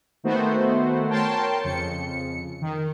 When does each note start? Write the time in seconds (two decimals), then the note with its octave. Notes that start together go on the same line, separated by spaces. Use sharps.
0.24 D#3 A3 B3 F#4 C5
1.08 A#4 C#5 G5 A5 C6
1.63 F2 C#3 C#7
2.61 D#3